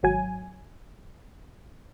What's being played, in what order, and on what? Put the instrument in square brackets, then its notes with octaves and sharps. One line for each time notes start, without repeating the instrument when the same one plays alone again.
[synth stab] G#1 F#3 G#5